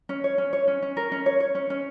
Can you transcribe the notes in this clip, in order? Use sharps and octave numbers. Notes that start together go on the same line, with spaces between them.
C#4
C#5
C#4
C#5
C#4
C#4
A#4
C#4
C#5
C#5
C#4
C#4